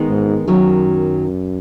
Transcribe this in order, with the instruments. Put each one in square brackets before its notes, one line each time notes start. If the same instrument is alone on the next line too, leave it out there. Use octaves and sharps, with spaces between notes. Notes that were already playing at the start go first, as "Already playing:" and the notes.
Already playing: [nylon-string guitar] D#3 G#3 B3 D#4 G#4
[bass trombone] G#2
[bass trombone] F#2 [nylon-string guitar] D#3 F#3 C#4